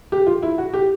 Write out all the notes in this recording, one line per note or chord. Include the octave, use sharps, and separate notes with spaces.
G4
F4
E4
F#4
G4